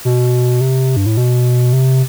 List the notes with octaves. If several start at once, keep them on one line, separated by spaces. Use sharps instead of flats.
B2
C3
G2
A2
B2
C3